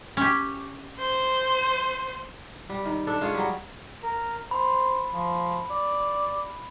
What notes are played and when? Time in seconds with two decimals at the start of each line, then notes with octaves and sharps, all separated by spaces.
0.17 C#4 G4
0.98 C5
2.69 G3
2.85 D#3
3.07 D4 A4
3.21 G#3 F4 G#4 C#5
3.34 F#3 G3
4.03 A#4
4.51 C5 B5
5.13 F3
5.70 D5